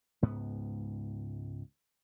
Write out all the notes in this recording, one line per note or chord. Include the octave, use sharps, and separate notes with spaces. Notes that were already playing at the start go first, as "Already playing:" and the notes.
C#2 G#2 B3